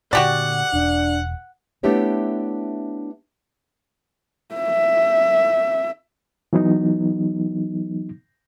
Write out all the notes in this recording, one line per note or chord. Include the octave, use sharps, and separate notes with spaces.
A#2 D3 F#4 G4 D5 F#5
E1 D4
A3 B3 D4 E4 G4 C#5
E5
E3 F#3 B3 D#4